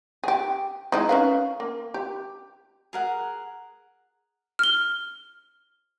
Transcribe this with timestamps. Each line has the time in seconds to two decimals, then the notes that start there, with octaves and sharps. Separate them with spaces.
0.24 G4 G#4
0.92 G#3 D#4 E4
1.09 C#4 B4 F5
1.60 A#3
1.94 G4
2.93 G#4 A#4 F#5
4.59 F6 G7